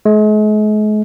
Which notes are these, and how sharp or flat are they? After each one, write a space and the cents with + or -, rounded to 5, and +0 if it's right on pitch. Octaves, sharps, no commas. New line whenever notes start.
G#3 +40